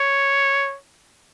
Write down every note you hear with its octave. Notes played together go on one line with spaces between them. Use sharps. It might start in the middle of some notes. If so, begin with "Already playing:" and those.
Already playing: C#5